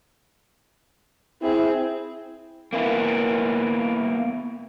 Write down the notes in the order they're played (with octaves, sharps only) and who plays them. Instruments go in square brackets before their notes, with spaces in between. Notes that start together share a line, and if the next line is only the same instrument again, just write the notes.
[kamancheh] C4 G#4 [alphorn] E4
[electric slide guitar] A#3 B3 E4